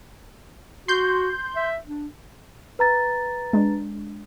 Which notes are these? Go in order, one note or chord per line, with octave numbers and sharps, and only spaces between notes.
F#4 C6 G6
E5
D4
B4 A#5 A6
G#3 D4